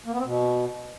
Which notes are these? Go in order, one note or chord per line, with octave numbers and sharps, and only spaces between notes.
A#3
B3
C4
B2